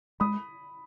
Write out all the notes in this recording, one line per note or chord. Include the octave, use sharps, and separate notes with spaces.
G#3 B5 D#6